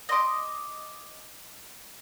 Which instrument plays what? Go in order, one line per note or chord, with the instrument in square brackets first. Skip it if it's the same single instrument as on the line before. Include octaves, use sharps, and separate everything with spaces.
[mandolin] D#5 C6 D6